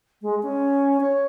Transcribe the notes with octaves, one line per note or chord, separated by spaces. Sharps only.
G#3
C#4
C#5